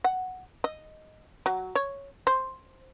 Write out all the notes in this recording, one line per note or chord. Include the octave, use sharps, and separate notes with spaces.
F#5
D#5
F#3
C#5
C5